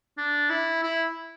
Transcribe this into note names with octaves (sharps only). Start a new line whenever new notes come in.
D4
E4
E4